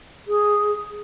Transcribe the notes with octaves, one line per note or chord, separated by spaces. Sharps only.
G#4